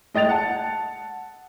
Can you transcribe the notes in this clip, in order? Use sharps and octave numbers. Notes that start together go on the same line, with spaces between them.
G#3 D#5 G5 A6 F7
F#5 A5